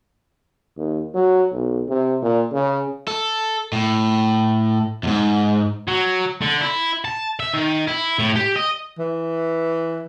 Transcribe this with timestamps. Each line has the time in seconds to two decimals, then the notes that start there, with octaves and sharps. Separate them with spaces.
0.77 D#2
1.14 F#3
1.52 B1
1.88 C3
2.22 A#2
2.52 C#3
3.08 A4
3.72 A2
5.03 E2 G#2
5.88 F#3
6.42 D3
6.62 E4
7.05 A5
7.40 E5
7.54 D#3
7.87 E4
8.19 A2
8.36 G4
8.56 D#5
8.99 E3